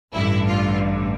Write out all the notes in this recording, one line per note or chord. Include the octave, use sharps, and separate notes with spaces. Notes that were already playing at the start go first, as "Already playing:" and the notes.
A1 G2 D3 E4
F4